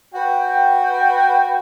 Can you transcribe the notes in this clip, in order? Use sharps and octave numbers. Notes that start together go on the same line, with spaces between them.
F#4 B4 G5